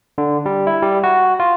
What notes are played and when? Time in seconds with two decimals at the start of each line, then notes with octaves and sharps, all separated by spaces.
0.18 D3
0.46 G3
0.67 E4
0.82 G3
1.04 F#4
1.40 F4